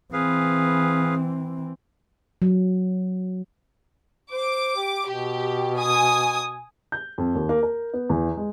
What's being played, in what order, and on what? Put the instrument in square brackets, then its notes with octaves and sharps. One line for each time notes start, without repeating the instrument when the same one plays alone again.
[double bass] E3 C4 [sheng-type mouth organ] G#4 B4 F5
[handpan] F#3
[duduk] C5 [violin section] D6
[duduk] G4
[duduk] B2 [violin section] G4
[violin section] G#5 D#6
[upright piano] G6
F2
D#2
A#3
A#4
B3
E2
G#3